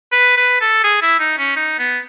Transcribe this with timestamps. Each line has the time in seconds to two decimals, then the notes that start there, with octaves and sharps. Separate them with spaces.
0.12 B4
0.37 B4
0.61 A4
0.84 G#4
1.02 E4
1.20 D#4
1.38 C#4
1.56 D#4
1.79 B3